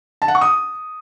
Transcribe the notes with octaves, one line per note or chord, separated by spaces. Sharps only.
A5
F#5
C#6
D#6